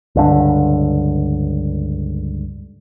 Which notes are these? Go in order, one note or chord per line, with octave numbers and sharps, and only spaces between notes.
C#2 G2 D3